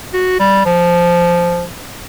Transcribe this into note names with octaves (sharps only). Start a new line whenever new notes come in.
F#4
G3
F3